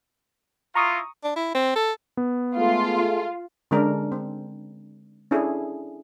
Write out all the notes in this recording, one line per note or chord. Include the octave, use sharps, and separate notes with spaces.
E4 F4 A#5 C#6 D#6
D4
E4
C4
A4
B3
G#3 A3 F4 A4
D3 G#3 C#4 D4 A#4
C4
C#4 D4 E4 G#4 A4